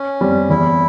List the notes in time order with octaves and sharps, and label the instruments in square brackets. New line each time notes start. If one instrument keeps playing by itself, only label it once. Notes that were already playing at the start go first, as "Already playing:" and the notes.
Already playing: [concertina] C#4
[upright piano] G3 C4
[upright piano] E2 [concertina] E4